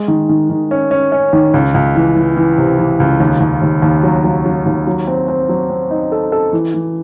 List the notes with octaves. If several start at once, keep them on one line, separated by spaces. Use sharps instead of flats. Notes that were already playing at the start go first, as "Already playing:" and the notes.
Already playing: G#3
D#3
D#3
D#3
C#4
C#4
C#4
D#3
C#2
C#2
E3
E3
E3
C3
E3
C#2
D#2
D#2
D#2
D#2
F#3
F#3
F#3
D#2
F#3
C4
C4
F#3
C4
D#4
A4
A4
E3
E3